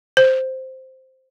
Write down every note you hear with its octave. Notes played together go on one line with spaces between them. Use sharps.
C5